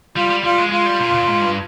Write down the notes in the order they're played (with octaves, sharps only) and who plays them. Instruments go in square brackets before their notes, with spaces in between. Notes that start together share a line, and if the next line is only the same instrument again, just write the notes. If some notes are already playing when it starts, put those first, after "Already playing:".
[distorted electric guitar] G3 [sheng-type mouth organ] F4
[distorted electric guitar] G3
[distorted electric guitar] G3 [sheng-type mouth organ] F4
[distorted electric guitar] G#3
[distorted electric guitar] G#3 [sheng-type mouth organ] F4
[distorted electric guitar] G3
A#2
A#2
G#2
G2